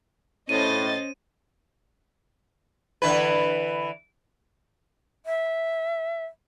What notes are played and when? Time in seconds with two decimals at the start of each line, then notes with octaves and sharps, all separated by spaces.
0.49 A2 C#4 C5 D#5 A6 D#7
3.02 D3 E3 B4
5.26 E5